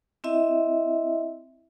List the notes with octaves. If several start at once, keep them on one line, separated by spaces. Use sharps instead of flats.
C4 E4 D#5 E5